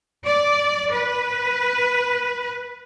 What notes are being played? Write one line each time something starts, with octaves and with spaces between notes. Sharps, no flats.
D5
B4